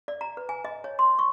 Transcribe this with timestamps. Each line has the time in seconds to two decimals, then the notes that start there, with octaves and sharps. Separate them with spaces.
0.08 D5
0.21 A#5
0.37 B4
0.49 G#5
0.65 D#5
0.84 C#5
0.99 C6
1.19 C#6